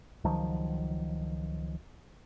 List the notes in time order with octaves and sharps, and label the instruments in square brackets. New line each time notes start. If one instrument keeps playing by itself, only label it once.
[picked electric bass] C#2 D#3 F3 F#3